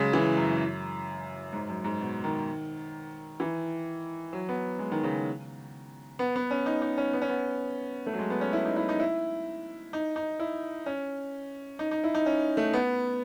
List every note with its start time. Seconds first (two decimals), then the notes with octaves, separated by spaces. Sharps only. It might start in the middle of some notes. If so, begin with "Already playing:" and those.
Already playing: C#3 F#3 G#3
0.13 E3
0.37 F#2
1.53 G#2
1.69 F#2
1.84 G#2
2.00 B2
2.24 D#3
3.40 E3
4.33 F#3
4.49 B3
4.79 G#3
4.92 D#3
5.03 C#3
6.19 B3
6.36 B3
6.51 C#4
6.66 D#4
6.82 D#4
6.97 C#4
7.13 B3
7.22 C#4
7.29 B3
8.06 A3
8.13 F#3
8.19 G#3
8.30 B3
8.41 C#4
8.53 E4
8.65 D#4
8.76 E4
8.89 D#4
9.00 E4
9.93 D#4
10.16 D#4
10.40 E4
10.86 C#4
11.79 D#4
11.91 D#4
12.04 E4
12.15 D#4
12.26 C#4
12.57 A3
12.73 B3